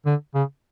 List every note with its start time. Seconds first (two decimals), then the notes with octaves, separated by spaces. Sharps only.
0.06 D3
0.35 C#3